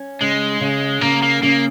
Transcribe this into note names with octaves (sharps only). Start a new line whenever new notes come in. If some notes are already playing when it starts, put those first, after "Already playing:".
Already playing: C#4
C#3 G#3
C#3
C#3 A#3
A#3
C#3 A#3